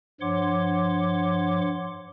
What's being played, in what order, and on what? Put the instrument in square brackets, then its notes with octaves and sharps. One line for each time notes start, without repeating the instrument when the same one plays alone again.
[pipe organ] G2 F3 C#5 F#5 C6 D6